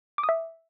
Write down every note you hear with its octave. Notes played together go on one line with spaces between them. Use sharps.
D6
D#6
E5